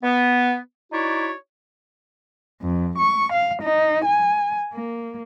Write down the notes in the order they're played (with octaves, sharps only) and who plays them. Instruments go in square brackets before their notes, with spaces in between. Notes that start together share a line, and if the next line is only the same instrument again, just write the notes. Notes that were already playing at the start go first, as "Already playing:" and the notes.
[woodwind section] B3
D#4 E4 F#4 C#5 D5
[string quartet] F2
C#6
F5
D#4
G#5
A#3